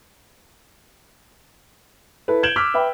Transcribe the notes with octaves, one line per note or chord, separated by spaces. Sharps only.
E4 A4 B4
G6 G#6 D7 E7 F#7 G7
D6 E6 F6 B6
B4 E5 G5 B5